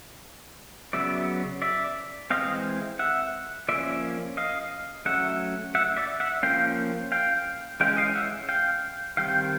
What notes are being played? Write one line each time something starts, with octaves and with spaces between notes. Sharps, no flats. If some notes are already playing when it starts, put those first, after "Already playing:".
C#3 F#3 B3 D5 E5
D5 E5
E3 G#3 C4 D#5 F5
E5 F#5
F3 A#3 C#4 D5 E5
D#5 F5
F#3 A3 C#4 E5 F#5
E5 F#5
D5 E5
E5 F#5
F3 A#3 C#4 F5 G5
F5 G5
E3 G#3 C#4 F5 G5
D#5 F5
E5 F#5
F5 G5
D#3 G3 C4 F5 G5